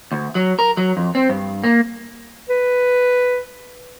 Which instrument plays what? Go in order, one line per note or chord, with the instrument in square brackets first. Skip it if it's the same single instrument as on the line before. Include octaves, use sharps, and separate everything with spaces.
[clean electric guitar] D2
F#3
A#4
F#3
F2
C4
G2
A#3
[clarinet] B4